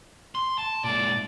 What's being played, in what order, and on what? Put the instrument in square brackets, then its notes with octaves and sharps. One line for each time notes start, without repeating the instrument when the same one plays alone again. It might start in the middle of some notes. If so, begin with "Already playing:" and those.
[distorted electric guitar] C6
A5
[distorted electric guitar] A#2 G#3 [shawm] D5